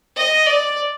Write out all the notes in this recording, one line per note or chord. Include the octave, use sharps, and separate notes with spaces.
D#5
D5